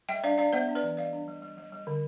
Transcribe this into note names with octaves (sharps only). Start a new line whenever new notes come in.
G3 E5 G5
D4 D5 F5
D4 D5 F5
B3 C5 E5
D4
B4 D5
E3
G3 D5 F5
D4
G3
G3
G3
G3
D3